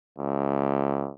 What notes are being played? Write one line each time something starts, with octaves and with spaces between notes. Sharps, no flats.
C#2